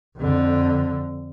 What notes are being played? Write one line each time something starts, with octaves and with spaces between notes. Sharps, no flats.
F2 D3